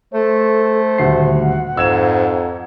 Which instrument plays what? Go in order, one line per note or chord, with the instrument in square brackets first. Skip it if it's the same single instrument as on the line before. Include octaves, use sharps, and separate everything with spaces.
[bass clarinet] A3 [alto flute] A4 [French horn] C5
[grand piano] D#1 D2 C7 [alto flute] F#5
[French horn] F2 [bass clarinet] G#2 [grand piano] E6 G#6 E7